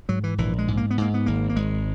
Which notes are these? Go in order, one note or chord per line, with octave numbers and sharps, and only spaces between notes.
G#2 F#3
E3
A#1 E3
G#3
G#2
A#3
B3
G#2 A#3
B3
G#1 A#3
A#3
G#1 G#3